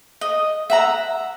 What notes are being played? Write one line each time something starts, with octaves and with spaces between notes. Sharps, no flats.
D#5
E5 F#5 A#5